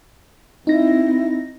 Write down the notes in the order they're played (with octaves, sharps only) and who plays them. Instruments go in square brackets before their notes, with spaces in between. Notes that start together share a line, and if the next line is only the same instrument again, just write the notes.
[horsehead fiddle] C4 E4 [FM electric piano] D#4 A#6